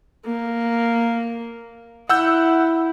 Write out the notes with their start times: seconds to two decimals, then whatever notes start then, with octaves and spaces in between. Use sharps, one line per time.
0.25 A#3
2.09 E4 F#5 E6 G6